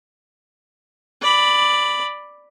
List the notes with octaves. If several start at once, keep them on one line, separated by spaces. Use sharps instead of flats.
D5 B5